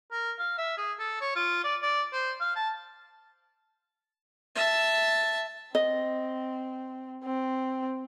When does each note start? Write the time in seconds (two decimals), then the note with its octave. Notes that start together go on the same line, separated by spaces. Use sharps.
0.11 A#4
0.38 F5
0.58 E5
0.77 G#4
0.99 A4
1.21 C#5
1.36 F4
1.64 D5
1.83 D5
2.13 C5
2.40 F5
2.56 A5
4.55 E5 A5
5.75 C4 D#5
7.24 C4